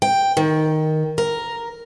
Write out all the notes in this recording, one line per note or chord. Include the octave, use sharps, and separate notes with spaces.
G5
D#3
A#4